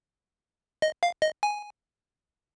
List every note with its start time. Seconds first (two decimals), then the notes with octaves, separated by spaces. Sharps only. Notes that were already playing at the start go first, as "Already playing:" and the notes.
0.82 D#5
1.03 F5
1.22 D#5
1.43 G#5